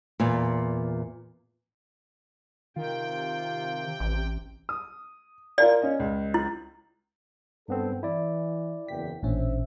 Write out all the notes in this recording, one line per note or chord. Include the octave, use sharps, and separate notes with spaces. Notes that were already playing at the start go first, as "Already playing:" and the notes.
E2 A#2
C3 D#3 F4 G5
A1
D#6
F4 A#4 D5 F5
C#4 C#5 D#5
C#2
E4
F#1 G2 B3 C4 A4
E3 E4 D5
F#1 E2 G5 B6
A1 A#2 C#4 D4 C5 E5